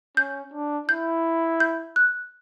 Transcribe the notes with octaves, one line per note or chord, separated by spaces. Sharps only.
C#4 G6
D4
E4 G6
G6
F#6